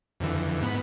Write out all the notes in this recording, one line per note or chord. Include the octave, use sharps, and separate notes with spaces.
F2 D3 E3
G#2 B3 B5